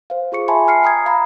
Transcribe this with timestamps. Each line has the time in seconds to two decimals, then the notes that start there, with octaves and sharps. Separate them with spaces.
0.10 C5 F5
0.32 F4 G#4 C#6 C#7
0.48 E5 F#5 G#5 A5 B5 C6
0.68 F6 C7 C#7
0.83 G5 A#5 D#6 G#6
1.06 F5 A#5 B5